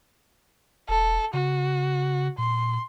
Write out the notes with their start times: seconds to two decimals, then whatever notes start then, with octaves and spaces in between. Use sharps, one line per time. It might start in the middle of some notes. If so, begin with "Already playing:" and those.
0.89 E1 A4
1.33 C#3 F#4
2.38 A#2 C6